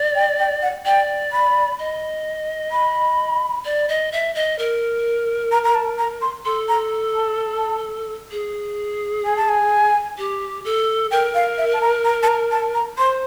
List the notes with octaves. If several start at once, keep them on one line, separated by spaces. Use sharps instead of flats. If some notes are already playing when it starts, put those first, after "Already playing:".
Already playing: D5
G5
G5
F#5
D5 G5
B5
D#5
B5
D5
D#5
E5
D#5
A#4
A#5
A#5
A5
A#5
C6
A4 C6
A#5
A5
G#4
G#5
A5
G#5
G4
A4
A#4 G5
F5
E5
A5
A#5
A#5
A5
A#5
A5
A#5
C5 C6